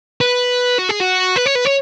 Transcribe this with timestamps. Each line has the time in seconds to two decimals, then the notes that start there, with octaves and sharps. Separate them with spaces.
0.21 B4
0.79 F#4
0.89 G#4
1.00 F#4
1.36 B4
1.46 C#5
1.55 B4
1.65 C#5